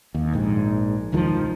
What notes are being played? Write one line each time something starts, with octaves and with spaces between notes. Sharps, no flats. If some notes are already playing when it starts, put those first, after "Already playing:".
D#2
A#1 G#2
E1 C#2 D#3 F3